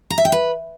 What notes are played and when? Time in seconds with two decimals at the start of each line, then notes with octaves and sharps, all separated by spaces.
0.10 A#5
0.18 E5
0.25 G5
0.32 B4